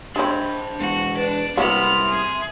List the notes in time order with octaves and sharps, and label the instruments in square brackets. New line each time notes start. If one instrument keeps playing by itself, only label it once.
[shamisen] G#3 C4 [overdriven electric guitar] D4 B5
[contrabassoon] E1 [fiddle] F#4
[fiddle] D4 [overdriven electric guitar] B4
[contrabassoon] C2 [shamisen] F#3 G#3 A#3 [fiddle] B3 F6 [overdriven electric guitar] E5 C6
[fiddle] G#4